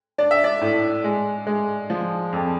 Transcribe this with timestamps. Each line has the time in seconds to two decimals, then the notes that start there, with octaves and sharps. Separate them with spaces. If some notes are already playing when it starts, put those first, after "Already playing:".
0.18 D4 D5
0.31 E5
0.44 D5
0.61 A2
1.04 G#3
1.47 G#3
1.90 F3
2.33 F2